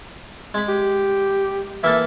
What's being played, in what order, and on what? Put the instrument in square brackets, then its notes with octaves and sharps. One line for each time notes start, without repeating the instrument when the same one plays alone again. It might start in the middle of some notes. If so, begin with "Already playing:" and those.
[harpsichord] G#3 B5
[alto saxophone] G4
[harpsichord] E3 A#3 A4 [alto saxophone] E5